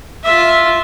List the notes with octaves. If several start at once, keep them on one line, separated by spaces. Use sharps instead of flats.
F4 E5